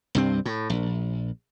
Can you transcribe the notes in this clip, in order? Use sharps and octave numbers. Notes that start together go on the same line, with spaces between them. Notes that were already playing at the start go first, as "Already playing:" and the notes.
C2 G2 C4
A2
A#1